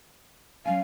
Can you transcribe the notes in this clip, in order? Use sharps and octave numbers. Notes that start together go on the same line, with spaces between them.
F#3 C#4 F5 G#5